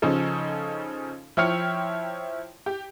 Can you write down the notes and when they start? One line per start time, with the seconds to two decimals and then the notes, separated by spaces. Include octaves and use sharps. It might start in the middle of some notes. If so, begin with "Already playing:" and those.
0.02 C#3 F3 C#4 D#4 A4
1.37 F3 E4 C#5 G5 F6 C#7
2.66 G4